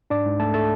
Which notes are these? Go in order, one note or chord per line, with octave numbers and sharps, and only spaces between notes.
G#2 D4 D5
G#2
A3 A4 A5
A3 A4 A5